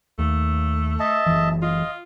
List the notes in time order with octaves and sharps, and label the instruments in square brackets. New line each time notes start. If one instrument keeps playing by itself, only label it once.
[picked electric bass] D#2 [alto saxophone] A3
[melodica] D#5 E5 A5
[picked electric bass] F#1 C2 E3
[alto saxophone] F4 [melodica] D#5